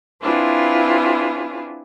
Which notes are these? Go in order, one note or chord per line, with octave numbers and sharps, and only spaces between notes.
C4 D4 E4 F4 G#4 B4